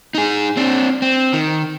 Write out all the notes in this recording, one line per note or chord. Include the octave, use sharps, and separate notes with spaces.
D#4 G#4
C4 D4
C4
D#3